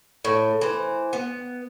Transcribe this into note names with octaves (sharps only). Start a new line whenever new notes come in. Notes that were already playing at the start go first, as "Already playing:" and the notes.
A2
E3 C5
B3